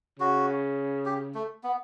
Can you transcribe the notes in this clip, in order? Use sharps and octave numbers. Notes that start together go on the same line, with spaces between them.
C#3 F#4
G4
A3
B3